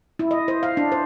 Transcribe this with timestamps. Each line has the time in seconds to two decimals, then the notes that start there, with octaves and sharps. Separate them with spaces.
0.19 E4
0.31 D#5
0.48 C5
0.63 F5
0.77 D4
0.92 C5